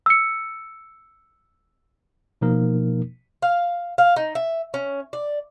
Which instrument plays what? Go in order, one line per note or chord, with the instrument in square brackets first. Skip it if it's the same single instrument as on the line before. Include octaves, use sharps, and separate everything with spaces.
[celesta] E6 C#7
[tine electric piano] B2 F3 A#3 D#4 A#4
[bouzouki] F5
F5
D#4
E5
C#4
D5